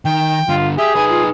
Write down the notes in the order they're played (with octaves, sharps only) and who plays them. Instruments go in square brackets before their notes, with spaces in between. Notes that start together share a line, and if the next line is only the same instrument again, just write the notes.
[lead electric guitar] D#3 [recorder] G5
[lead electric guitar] G2 D3 [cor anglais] F4
[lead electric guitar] G4 [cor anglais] G#4 [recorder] E5
[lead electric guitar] D#4 B4 [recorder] G#5
[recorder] F4